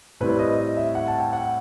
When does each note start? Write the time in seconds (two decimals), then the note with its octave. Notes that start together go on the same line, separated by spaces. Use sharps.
0.20 A2 G3 C4 B4
0.39 D#5
0.59 D#5
0.77 E5
0.95 F#5
1.08 A5
1.20 G5
1.33 F#5